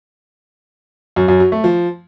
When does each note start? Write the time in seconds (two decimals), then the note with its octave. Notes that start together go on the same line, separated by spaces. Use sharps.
1.16 F#2
1.28 F#2
1.40 F#3
1.52 A3
1.64 F3